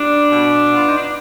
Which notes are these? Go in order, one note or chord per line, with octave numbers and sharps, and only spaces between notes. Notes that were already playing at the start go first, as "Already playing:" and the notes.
Already playing: G3 D4
B2
B3
F4
D#4
D4